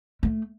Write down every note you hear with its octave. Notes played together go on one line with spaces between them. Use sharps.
A3